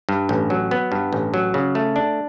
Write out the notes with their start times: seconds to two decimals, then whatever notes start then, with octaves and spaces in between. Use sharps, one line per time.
0.09 G2
0.29 A1
0.50 F#3
0.71 B3
0.92 G2
1.13 A1
1.34 F#3
1.54 C#3
1.75 A3
1.96 D4